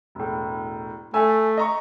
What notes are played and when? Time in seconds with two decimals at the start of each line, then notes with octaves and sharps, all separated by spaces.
0.15 E1 A2
1.14 A3 G#5 E6
1.57 D#5 A#5 C#6